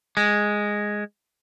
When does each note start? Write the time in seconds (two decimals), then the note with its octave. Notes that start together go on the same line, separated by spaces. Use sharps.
0.17 G#3